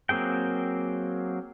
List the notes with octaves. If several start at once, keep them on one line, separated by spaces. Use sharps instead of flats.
F#3 A#3 C4 G#4 G5